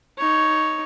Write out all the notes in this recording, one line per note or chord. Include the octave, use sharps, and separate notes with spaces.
D#4 C#5